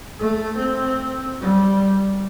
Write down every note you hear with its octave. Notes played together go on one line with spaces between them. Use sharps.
A3
C4
G3